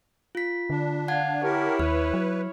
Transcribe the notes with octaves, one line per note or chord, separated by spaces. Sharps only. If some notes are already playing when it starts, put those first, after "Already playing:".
F4 B6
D3 D4
F5 F#5 A5 G#6
E4 G4 A#4 C#5
D#2 B4 F6
F#3